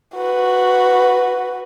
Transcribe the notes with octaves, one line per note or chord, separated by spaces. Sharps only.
F#4 B4